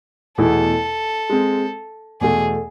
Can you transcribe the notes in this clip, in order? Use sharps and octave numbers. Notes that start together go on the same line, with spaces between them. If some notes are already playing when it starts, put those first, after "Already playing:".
E2 B2 A3 E4 G#4 A4
G#3 C4 G#4
E2 B2 A3 G#4